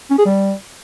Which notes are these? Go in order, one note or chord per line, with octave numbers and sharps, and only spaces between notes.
C#4
G#4
G3